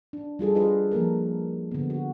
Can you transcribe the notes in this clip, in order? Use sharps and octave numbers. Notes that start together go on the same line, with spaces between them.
D4
G3 F4 G#4 A4
D4 F4 G4 G#4 B4 D#5
F3 A#3 A4 A#4
D3 B3
F#4